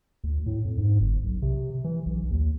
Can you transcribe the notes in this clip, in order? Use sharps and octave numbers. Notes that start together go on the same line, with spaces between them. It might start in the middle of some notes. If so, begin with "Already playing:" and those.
D2
A2
F2
G#2
G1
B1
C3
E3
B1
D#2